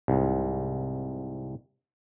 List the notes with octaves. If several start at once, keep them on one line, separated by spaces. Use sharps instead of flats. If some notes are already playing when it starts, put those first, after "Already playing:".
C2 G#2